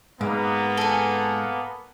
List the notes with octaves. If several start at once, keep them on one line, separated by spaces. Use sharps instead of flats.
G#2 A#3 B3
A4 G#5